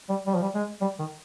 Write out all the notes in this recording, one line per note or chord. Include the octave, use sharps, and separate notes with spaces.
G3
G3
F3
G3
G#3
G3
D#3